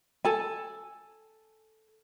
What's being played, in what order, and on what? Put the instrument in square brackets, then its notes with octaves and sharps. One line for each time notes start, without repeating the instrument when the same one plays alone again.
[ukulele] A4 G#5